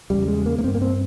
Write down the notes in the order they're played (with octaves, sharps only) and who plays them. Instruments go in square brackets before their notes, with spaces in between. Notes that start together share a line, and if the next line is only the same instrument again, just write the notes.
[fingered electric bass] E2 C#3 G3
G#3
A#3
A#3
G2 C4
A#3
C4